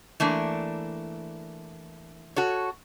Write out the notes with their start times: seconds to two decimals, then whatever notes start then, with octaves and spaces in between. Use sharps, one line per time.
0.20 E3 A3 A#3 D4
2.36 F#4 A4 C#5